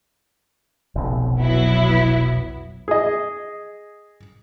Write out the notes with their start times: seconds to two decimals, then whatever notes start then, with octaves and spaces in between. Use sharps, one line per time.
0.96 F1 B1 B2
1.39 F#3 B3 E4
2.88 G#4 D#5